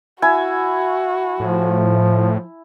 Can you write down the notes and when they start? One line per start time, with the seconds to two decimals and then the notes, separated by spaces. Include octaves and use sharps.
0.22 E4 F#4 G#5
1.40 A2 F3